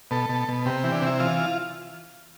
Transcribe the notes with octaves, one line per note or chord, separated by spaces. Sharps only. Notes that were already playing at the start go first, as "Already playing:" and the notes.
B2 A4
B2
B2
C3 G4
E3
D4
C3 E4
E3 F4